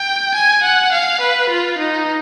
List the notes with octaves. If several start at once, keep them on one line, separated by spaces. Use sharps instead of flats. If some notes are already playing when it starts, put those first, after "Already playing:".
Already playing: G5
G#5
F#5
F5
B4
F4
D#4